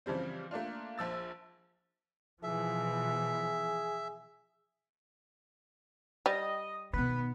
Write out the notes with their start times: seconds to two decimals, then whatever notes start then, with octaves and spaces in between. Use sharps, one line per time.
0.06 C#3 E3 F3 G3 C4
0.51 A3 A#3 D4 F4
0.98 A#1 F3 E6 A6
2.43 B2 E3 F3 G#4 E5
6.26 G3 D#5
6.93 B2 D#3 B3 B4